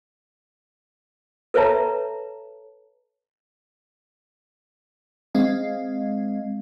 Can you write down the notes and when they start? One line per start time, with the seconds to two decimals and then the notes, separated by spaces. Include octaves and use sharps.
1.54 A4 B4 C#5 E5 A5 A#5
5.34 G#3 C4 D#5 F5